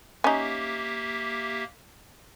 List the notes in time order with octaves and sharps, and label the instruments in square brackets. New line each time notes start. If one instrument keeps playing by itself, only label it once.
[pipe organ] A#3 G4 E5 [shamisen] C#4 D#4